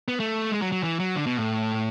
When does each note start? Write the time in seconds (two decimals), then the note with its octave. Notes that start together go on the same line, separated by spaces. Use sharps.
0.08 B3
0.20 A3
0.52 G#3
0.62 F#3
0.72 F#3
0.83 E3
1.00 F#3
1.16 D3
1.26 B2
1.37 A2